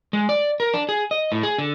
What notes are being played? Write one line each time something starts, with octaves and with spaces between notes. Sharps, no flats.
G#3
D5
A#4
D4
G#4
D#5
A2
G#4
D3